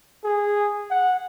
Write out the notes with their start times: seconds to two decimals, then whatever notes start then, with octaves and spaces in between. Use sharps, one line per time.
0.24 G#4
0.90 F#5